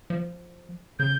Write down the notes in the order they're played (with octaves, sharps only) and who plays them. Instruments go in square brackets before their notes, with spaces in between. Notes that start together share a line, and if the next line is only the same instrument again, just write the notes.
[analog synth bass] F3
[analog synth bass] C#3 [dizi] G6